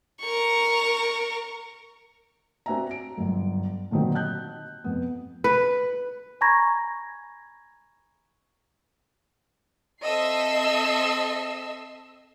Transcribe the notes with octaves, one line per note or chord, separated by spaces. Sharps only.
A#4 C#6
C4 D4 F#4 E5 G#5 A#5
D7
G1 F#2
A#2 D3 D#3 F#3 C4
D#5 A5 F#6 G6
F2 B3
B4
G#5 A#5 B5 C#6 G#6 A#6
C4 A4 D#5 E5 E6 C7